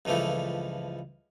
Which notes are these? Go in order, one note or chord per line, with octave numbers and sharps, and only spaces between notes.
C#2 G2 E3 F3 A3